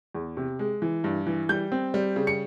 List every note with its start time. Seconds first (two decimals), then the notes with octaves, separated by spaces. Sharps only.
0.15 E2
0.37 C3
0.59 G#3
0.82 E3
1.04 G2
1.26 E3
1.49 G3 G6
1.72 C4
1.94 G3
2.16 C#3
2.27 C#7